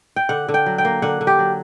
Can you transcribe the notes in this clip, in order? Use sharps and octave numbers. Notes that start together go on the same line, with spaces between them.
G5
D3 F#5
D3
G5
F#3
G5
A#3
D3 F#5
D3
G4
F#3